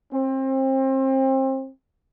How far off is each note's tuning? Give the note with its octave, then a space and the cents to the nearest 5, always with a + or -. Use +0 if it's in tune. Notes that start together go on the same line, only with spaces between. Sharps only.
C4 +30